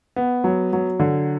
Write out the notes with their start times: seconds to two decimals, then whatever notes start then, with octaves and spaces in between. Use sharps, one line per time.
0.16 B3
0.44 F#3
0.73 F#3
1.00 D3